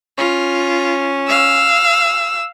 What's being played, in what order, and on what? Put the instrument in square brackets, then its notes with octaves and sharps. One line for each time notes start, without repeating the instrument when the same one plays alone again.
[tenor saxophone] C#4 [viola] F4
[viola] F5 [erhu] E6